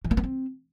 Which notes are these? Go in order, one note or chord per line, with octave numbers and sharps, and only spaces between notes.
E3
A#3
B3
C4